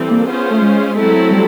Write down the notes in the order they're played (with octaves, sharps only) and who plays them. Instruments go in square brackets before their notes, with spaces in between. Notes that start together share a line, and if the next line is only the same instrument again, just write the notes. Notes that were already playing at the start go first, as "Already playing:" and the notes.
Already playing: [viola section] E3 G3 C4 A4
[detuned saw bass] A#3
[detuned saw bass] B3 [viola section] C#4 F4 G#4 C5
[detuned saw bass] B3
A3
G#3
[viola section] F#3 A3 C4 E4 A4
[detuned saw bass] G3